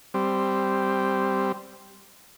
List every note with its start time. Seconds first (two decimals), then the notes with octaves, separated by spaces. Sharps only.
0.14 G3 C4